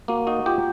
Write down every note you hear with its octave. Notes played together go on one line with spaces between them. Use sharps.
A#3 F#4
D#4 F#4
F4 G4